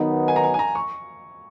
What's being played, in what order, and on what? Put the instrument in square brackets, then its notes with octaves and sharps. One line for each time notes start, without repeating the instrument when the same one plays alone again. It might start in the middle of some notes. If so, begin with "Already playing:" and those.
Already playing: [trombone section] D#3 F#3 B3 D#4
[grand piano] G#5
A#5
G#5
G#5
A#5
C#6